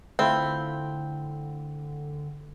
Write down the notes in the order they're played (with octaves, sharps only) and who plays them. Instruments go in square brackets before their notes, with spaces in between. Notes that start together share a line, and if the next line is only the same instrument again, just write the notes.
[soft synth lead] D3 [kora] A3 E4 F4 [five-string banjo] C4